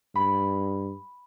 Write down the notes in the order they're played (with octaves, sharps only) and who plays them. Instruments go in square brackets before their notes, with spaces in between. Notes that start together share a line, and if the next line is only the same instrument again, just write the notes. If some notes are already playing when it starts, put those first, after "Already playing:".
[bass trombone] G2 [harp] B5